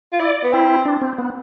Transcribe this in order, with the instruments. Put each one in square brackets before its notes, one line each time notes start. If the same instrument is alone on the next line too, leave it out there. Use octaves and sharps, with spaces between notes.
[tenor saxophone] F4
[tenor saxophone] E4 [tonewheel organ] D5
[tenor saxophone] B3
[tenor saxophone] C4 [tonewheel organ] E4
[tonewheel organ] D4
C4
B3